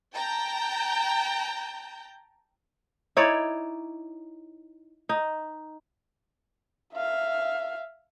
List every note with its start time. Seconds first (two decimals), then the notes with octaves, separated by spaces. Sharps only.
0.14 G5 A5 A#5 G6
3.17 D#4 E4 C#5 D5
5.09 D#4
6.94 E5 F5